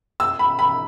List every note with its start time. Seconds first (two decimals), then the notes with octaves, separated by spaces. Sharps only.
0.20 E6
0.39 B5
0.59 B5